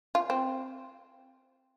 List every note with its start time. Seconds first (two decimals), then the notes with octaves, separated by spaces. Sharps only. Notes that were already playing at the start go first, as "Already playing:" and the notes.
0.15 F4
0.30 C4